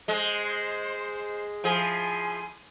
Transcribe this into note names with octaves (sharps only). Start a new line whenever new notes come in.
G#3 C5
F3 E4 G#4 G#5 C6